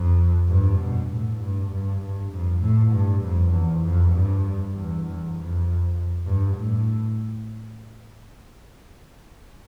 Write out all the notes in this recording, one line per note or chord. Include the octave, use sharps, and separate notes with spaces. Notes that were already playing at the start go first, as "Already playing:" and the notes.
Already playing: F2
G2
B2
A2
G2
G2
G2
F2
A2
G2
F2
E2
F2
G2
E2
E2
F2
G2
A2